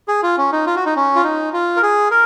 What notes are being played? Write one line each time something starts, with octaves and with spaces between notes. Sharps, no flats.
G#4
F4
C#4
D#4
F4
F#4
D#4
C#4
F4
D#4
F4
A#4
G#4
A#4